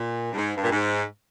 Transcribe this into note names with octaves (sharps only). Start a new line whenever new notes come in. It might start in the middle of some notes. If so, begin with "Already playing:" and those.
Already playing: A#2
G2
G#2
G2
A#2
G#2